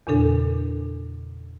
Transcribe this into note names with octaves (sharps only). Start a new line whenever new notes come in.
E2 A#2 C#3 D4 A4